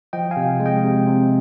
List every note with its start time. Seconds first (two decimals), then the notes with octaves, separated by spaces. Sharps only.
0.13 F3 D#5 G5
0.31 F5 G#5
0.37 C3
0.60 G#3
0.66 D#5 G5
0.84 C3
1.07 C3